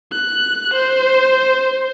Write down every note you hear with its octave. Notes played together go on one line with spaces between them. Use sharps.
F#6
C5